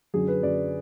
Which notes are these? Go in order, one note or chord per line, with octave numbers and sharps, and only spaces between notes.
F#2 D3 F#3 G#4
B4
F#2 D3 F#3 D5